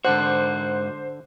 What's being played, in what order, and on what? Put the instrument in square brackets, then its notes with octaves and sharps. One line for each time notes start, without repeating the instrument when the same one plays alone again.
[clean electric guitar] G#2 F#4 [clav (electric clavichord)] D3 D4 F#5 [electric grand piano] C5 [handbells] F#6